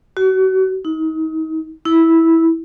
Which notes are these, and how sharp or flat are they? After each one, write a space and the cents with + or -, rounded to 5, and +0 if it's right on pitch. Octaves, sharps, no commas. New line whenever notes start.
F#4 +35
D#4 +35
E4 -10